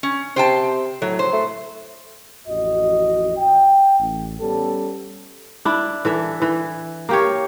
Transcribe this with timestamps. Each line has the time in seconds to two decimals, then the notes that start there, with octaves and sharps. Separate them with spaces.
0.03 C#4
0.36 C3 C5 G5 A5
1.02 A2 F#3
1.19 C5
1.33 A3
2.48 A1 F2 F#4 D#5
3.37 G5
4.00 A1
4.40 G3 B3 C#4 A4
5.65 D4 E4
6.05 E3 A4 E5
6.42 E3
7.09 A#3 G4 C#5